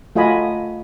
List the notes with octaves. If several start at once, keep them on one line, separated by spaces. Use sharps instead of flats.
A3 F4 F#4 D#5 G#5 B5